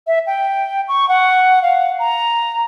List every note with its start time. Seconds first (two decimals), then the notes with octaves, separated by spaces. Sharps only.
0.07 E5
0.27 G5
0.88 C#6
1.09 F#5
1.62 F5
1.99 A#5